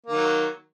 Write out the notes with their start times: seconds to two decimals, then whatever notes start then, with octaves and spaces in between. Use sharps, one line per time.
0.06 A#3
0.10 D#3
0.15 F#3